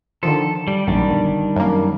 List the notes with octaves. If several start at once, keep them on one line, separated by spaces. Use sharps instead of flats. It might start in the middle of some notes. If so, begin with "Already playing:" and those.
D3 D#3 F3 A4
G3
A#1 F#2 D#3 G3 D4
G1
F#2 A#3